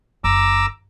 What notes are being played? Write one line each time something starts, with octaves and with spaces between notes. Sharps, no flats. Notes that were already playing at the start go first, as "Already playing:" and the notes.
F#1 A#5 D6 E6